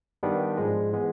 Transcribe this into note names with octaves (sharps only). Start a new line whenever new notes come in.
G2 D#3 G3 B3 D4
G#2 F3 G#3
E3 G#3 B3